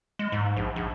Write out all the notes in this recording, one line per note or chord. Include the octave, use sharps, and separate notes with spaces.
G#3
G#2
A#1
A#1